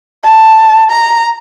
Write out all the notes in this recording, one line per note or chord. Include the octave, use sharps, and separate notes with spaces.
A5
A#5